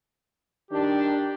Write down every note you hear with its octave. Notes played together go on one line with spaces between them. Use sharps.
D#3 D4 G4